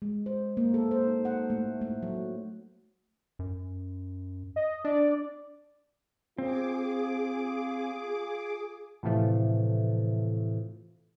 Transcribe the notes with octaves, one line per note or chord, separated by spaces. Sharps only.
G#3
C5
A#3
A4
C5
D#4
F#5
A3
A3
F#3
F#2
D#5
D4 D5
C4 F4 G#4 D6
A2 C3 E3 F3 A3